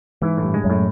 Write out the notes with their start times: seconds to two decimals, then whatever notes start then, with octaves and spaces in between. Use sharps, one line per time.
0.22 G#2 E3
0.37 A2
0.43 G2
0.54 G#3
0.64 F#2
0.70 A2